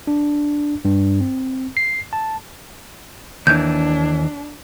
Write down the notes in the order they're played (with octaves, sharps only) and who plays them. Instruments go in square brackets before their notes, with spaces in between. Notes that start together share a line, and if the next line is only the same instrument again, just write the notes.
[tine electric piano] D4
G2
C4
C7
A5
[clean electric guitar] D#2 E3 [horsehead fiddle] D4 [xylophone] G6